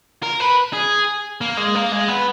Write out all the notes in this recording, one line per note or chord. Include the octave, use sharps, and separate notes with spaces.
A#4
B4
G#4
A#3
G#3
A#3
G#3
B3